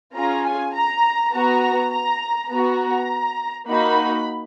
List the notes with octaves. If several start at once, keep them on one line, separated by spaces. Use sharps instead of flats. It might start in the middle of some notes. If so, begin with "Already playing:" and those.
C#4 F4 G#4 A#5
G#5
A#5
B3 F#4 A#5
A#5
B3 F#4 A#5
A#3 D#4 F#4 B5